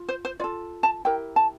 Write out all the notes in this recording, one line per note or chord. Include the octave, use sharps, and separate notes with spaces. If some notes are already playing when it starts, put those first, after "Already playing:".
Already playing: F4
C5
C5
F4 A4 D5
A5
E4 G4 A#4 G5
A5